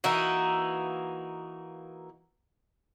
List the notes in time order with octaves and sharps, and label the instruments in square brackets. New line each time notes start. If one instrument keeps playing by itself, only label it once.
[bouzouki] E3 A#3 D#4 F#4